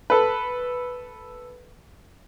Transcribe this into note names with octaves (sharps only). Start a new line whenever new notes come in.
A4 B4